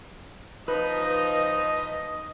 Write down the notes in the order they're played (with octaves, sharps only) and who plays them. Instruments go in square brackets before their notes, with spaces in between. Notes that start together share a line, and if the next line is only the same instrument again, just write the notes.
[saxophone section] F3 D#4 [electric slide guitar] B4 [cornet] D#5